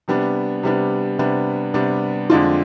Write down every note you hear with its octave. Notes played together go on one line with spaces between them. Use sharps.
C3 G3 B3 D4
C3 G3 B3 D4
C3 G3 B3 D4
C3 G3 B3 D4
F2 D3 G#3 D4 F4